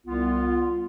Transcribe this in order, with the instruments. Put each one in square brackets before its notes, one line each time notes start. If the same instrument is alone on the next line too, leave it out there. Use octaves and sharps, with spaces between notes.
[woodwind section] C2 B3 F4